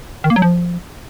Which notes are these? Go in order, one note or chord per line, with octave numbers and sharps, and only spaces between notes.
D#3
A#3
F#3
F3